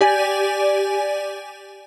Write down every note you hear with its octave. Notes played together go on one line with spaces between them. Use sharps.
G4 D5 G#5